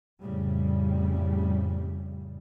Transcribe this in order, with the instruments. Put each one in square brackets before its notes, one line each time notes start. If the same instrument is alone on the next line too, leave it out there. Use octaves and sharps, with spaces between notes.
[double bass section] F2 A2 C#3 G3